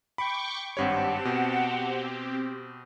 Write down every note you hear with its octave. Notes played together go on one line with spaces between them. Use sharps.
G5 B5 C#6 D6
G#1 G2 C4 G4 C#5 F#5 A5
B2